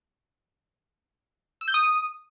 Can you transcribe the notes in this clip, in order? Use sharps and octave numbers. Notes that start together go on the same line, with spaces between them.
E6
G6
D#6